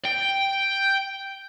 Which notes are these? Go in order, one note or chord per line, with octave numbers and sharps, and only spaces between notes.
G5